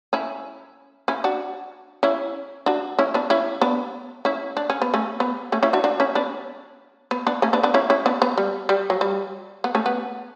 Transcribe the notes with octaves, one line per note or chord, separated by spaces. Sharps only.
C#4 E4
C#4 E4
D4 F#4
C#4 E4
D4 F#4
C#4 E4
B3 D4
C#4 E4
B3 D4
C#4 E4
D4
C#4
B3
A3 C#4
B3
A3 C#4
C#4 E4
D4 F#4
D4 F#4
C#4 E4
B3 D4
B3
B3 D4
A3 C#4
B3 D4
B3 D4
C#4 E4
C#4 E4
B3 D4
B3
G3
G3
F#3
G3
B3
A3 C#4
B3